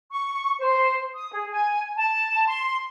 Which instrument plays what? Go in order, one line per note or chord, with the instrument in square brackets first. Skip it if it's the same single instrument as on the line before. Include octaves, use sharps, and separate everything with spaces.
[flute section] C#6
C5
D#6
G#4
G#5
A5
C6